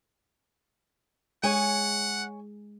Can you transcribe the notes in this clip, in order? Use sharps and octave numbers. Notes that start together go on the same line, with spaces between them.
G#3 G#4 C#5 F#5 G#5